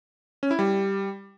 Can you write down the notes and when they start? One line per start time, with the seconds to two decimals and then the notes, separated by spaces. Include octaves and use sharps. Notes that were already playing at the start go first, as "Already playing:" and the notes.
0.43 C#4
0.51 E4
0.59 G3